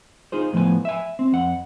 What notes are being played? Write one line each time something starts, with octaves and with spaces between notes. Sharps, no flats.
D#4 F4 G#4 C5
A2 F3 B3 G#5
E5 G#5
C4
F2 F#5